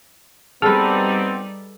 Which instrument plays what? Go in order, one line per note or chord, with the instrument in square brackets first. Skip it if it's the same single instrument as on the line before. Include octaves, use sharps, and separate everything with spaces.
[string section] G3 D#4 D5 [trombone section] B3 C4 [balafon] G#4 [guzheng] A4 B4